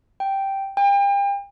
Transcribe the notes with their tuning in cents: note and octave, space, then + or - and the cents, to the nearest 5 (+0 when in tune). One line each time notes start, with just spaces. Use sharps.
G5 -5
G5 +35